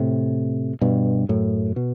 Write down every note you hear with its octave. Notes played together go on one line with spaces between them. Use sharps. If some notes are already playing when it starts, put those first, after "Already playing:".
Already playing: A2 C3
G2 B2
F#2 A2
B2